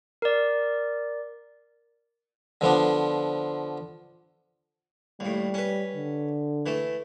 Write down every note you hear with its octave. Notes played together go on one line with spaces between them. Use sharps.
A#4 D5
D3 F3 B3 D4
D#2 A2 G3
C#4 B4
D3
E3 A3